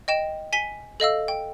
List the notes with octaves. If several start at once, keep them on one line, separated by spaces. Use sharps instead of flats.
D#5 G5 E7
G#5 B6 G7
A4 D#5 F5 E6
G5